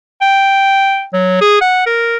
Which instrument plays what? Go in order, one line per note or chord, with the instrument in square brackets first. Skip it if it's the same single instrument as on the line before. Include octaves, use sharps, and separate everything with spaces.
[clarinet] G5
F#3
G#4
F#5
A#4